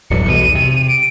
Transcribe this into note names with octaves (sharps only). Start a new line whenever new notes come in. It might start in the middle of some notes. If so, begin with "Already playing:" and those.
D1 G2 F#3 C#7
B1 E2 D#7
C3
D7